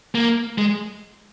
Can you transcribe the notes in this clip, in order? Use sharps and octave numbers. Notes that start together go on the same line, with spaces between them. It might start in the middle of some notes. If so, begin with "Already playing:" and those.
A#3
G#3